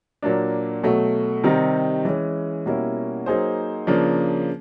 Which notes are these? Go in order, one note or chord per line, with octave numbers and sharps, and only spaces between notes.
A#2 F#3 A#3 D4
B2 F#3 A3
C3 D#3 G3 C4 D#4
E3 G#3 C#4
B2 G3 A#3 C#4 E4
F#3 A#3 D#4 G#4 C5
C#3 F3 A#3 D4